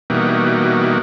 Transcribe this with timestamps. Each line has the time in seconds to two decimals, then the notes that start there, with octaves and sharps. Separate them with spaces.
0.10 B2 E3 G3 A#3 D#4 F#4